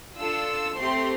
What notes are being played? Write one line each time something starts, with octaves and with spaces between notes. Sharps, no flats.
D4 F4 A4 E6
A3 C4 G4 C6